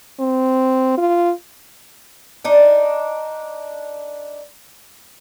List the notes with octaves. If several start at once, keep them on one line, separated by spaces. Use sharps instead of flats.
C4
F4
D4 D#4